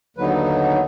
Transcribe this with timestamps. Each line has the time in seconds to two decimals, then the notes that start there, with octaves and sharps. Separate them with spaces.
0.17 D#2 D3 F#3 B3 D#4 B4